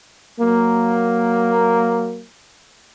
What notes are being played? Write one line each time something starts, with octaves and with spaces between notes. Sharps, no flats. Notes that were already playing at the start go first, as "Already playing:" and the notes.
F#3 A#3